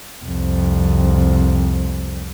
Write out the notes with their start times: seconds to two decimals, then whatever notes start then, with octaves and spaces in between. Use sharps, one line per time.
0.25 C2 F2